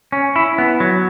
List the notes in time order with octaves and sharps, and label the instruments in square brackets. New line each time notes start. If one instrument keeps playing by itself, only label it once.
[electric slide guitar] C#4
E4
B3
F#3